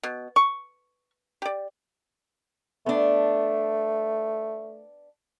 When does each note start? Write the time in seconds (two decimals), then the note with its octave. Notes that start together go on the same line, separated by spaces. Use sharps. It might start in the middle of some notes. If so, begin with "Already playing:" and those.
0.03 B2
0.36 C#6
1.42 G4 D5
2.86 A3 B3 D4